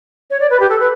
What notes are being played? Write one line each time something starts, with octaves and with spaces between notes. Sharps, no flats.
C#5
D5
B4
G4
A4
B4